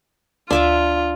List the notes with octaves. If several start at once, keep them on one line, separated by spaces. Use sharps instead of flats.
D2 D4 F4 E5 D6